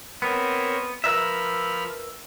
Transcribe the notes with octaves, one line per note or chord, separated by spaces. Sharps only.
B3 C4 A#4 C#5
F3 A#4 B4 E5 B5 F6